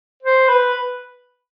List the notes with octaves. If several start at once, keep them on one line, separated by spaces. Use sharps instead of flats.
C5
B4